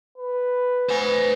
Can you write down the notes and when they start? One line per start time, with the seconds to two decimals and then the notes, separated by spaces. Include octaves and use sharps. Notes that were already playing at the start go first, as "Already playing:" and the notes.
0.18 B4
0.89 B3 C5 G#5